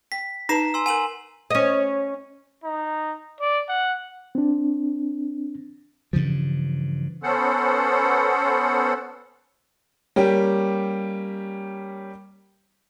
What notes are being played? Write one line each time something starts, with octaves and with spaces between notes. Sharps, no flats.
G5 B6
D#4 B4 A5 A#5 C7 E7
G#5 C6 E6
A#4 F#5 G#5 D#7 F#7
C#4 D#5
D#4
D5
F#5
C4 D4
G2 C#3 E3 F3
B3 C#4 A4 C5 F#5
G3 A#3 C#4 G4